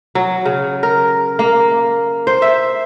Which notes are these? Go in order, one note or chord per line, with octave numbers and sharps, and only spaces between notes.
F#3
C#3
A#4
A#3
C5
E5